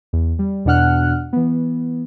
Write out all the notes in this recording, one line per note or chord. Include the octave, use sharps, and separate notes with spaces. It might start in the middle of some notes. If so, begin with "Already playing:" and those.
E2
G3
E2 B2 D4 F#5 F6 F#6
E3 B3